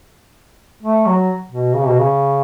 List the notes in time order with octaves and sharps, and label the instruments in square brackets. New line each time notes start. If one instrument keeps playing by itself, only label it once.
[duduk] A3
F#3
B2
C#3
B2
C#3